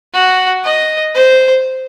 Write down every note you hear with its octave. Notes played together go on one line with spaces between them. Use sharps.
F#4
D#5
C5